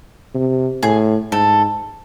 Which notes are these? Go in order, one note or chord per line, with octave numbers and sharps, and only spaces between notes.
C3
A2 G#4
G#2 A4